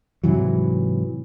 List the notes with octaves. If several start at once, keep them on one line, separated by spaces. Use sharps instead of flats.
G#2 C3 E3 F#3